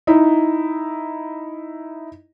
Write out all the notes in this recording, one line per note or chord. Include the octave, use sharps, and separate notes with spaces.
D#4 E4